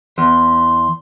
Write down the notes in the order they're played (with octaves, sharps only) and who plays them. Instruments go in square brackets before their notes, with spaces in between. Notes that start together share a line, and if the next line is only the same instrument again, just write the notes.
[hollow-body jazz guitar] E2 [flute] C6